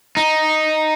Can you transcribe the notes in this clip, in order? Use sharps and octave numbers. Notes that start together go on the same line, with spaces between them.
D#4